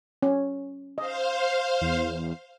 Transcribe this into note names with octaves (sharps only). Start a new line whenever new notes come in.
C#4
C5 D#5 F5
E2